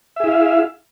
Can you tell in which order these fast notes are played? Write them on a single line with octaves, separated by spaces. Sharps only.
E5 G#4 E4 F5